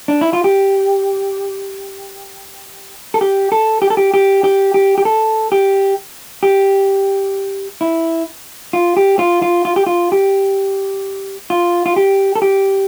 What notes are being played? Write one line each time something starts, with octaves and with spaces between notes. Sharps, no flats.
D4
E4
F4
G4
A4
G4
A4
G4
A4
G4
G4
G4
G4
G4
A4
G4
G4
E4
F4
G4
F4
F4
F4
G4
F4
G4
F4
F4
G4
A4
G4